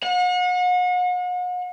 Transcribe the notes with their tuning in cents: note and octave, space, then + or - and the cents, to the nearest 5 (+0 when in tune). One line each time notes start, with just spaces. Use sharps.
F#5 -40